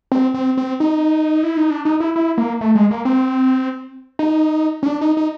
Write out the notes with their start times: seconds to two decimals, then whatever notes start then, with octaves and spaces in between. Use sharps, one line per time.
0.12 C4
0.34 C4
0.58 C4
0.80 D#4
1.43 E4
1.57 D#4
1.70 D4
1.85 D#4
2.00 E4
2.16 E4
2.38 A#3
2.61 A3
2.75 G#3
2.91 A#3
3.05 C4
4.19 D#4
4.83 C#4
4.86 D4
5.01 D#4
5.17 D#4